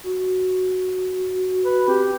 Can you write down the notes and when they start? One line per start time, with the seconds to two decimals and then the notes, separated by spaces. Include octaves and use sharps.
0.04 F#4
1.65 B4
1.88 C4 G4